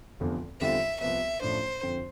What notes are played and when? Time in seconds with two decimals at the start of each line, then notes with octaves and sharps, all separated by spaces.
0.20 F1 E2 D3 F3
0.61 E2 D3 G3 C4 F4 E5
1.01 C2 C3 F3 B3 E5
1.41 A1 A2 F3 A3 D4 C5
1.83 F2 D3 F3 C4